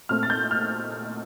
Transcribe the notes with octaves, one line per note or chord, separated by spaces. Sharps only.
A#2 A3 C4 F6
A6
G6
F6